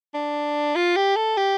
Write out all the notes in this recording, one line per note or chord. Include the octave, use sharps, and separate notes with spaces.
D4
F4
G4
A4
G4